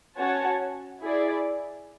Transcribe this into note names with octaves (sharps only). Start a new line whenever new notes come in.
C#4 F#4 C#5 F#5 A5
E4 G#4 D5